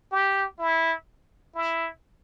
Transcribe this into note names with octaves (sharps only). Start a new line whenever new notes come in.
G4
E4
E4